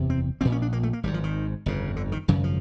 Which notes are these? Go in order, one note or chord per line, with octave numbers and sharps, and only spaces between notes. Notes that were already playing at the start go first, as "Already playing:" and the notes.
Already playing: F#1 E2 C3
C4
A#1 A#2 C4
C#4
D4
A#3
A3
A#3
G#1 G#2 G3
F3
D#3
G1 F2 C#3
D3
D#3
G#1 F#2 C#3 E3
F3